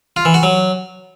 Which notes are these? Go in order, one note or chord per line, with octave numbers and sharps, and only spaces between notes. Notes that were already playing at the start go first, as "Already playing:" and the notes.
F4
E3
F#4
F#3